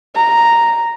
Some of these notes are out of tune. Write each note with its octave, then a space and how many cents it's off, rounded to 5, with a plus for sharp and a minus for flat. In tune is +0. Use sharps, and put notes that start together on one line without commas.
A#5 +0